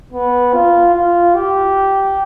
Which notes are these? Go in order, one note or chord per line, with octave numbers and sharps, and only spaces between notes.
B3
F4
F4
G4